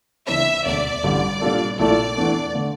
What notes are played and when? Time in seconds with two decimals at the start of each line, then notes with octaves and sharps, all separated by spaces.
0.27 C#2 C#3 E3 A#3 D4 E5
0.65 E1 D2 D3 A3 D5
1.03 A1 G2 D3 G3
1.41 A#2 G3 D4 F4 A4
1.78 A#1 A#2 A3 E4 A4 D5
2.17 E2 E3 A3 D4 A4
2.55 D3 A3